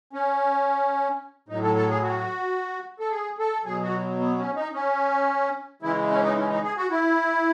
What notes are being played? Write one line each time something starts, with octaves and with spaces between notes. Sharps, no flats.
C#4
A2 F#3 D#4
A4
A4
G#4
F#4
A4
G#4
A4
B2 F#3 G#4
F#4
B3
C#4
D#4
C#4
C#3 E3 G#3 E4
C#4
D#4
C#4
D#4
G#4
F#4
E4